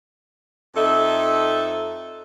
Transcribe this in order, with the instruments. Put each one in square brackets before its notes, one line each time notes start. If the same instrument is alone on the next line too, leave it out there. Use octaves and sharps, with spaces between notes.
[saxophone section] F2 D#4 A4 E5